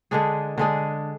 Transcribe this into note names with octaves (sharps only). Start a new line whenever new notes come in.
D3 G#3 D4 G#4
D3 G#3 D4 G#4